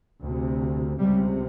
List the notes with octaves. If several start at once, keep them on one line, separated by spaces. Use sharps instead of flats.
D2 C3
C#2 C3 G3